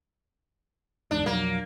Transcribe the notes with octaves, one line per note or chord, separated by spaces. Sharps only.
G1 E2 G#2 D4
B1 F2 F#3 A#3